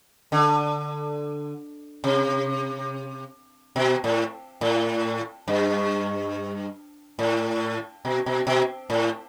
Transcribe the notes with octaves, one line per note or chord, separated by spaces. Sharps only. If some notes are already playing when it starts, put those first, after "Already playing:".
D3
C3
B2
A2
A2
G2
A2
B2
B2
B2
A2